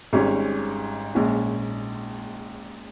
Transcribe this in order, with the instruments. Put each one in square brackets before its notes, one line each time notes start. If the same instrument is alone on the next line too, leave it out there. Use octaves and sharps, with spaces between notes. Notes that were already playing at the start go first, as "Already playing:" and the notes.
[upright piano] G#1 G#2 G3 C#4
A#1 A#2 G#3 C#4